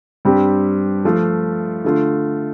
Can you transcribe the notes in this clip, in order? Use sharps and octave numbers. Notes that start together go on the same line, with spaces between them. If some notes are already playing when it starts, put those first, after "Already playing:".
G2 G3 C4 G4
F3 A3 F4
D3 A3 F4